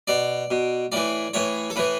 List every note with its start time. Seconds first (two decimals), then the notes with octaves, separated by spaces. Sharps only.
0.07 B2 D5
0.51 B2
0.92 A2 E3 D5
1.34 A2 E3 C#5
1.70 A4
1.76 A2 E3 B4